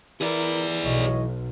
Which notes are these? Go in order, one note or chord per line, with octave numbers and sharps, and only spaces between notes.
E3 E4 G#4 A#4 D5
B1 C#5 D#5